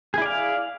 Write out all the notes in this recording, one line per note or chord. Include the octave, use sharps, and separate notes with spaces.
E4 G#4 D5 F5